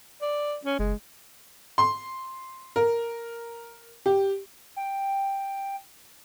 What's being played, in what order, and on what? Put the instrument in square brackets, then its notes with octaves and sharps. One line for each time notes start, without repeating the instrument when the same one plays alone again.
[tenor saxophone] D5
C#4
[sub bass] F#1 [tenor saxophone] G#3
[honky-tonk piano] C6
A#4
G4
[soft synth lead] G5